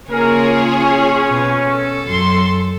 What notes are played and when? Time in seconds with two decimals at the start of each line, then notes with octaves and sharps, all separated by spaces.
0.10 C#3 A#3 F4 G#4 A#4 C#5
0.80 C#4
1.28 B2 B4
1.70 A4
2.07 F#2 F#3 C6